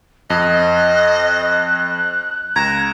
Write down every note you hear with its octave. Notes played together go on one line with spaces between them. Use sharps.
F2 D#5 F#6
C#2 A#5 G#6 A#6 E7